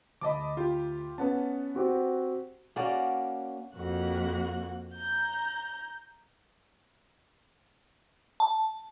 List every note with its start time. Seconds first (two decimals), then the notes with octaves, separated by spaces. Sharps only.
0.21 D2 D#5 A5 B5 D6
0.57 F4 G4
1.18 B3 C#4 B4 F#5 A5
1.75 C4 F#4 G4
2.76 A#3 C#4 F#4 D5
3.74 F2 A#3 F#4 F#6
4.94 A#5 G6
8.40 A5